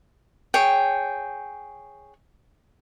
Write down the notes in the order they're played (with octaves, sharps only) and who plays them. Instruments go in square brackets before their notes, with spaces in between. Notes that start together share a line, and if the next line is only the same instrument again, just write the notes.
[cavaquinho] G#4 C#5 G5